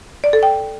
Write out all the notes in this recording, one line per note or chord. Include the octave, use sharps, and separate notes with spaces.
D5
A4
G5